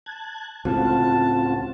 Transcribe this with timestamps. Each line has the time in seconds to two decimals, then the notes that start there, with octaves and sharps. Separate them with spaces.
0.06 A5 F#6 G#6
0.65 C#2 A2 C4 F4 F#4 A5